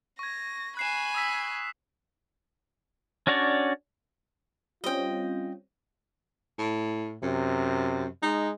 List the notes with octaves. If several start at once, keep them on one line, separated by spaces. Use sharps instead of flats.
C#6 G#6 A#6
G#5 B5 F#6 C7 E7
D#6 E6 B6
C#4 D4 F#4 C#5 D5
G3 C4 C#4 F4 D#5 G5
A2
F#2 C3
G#3 D#4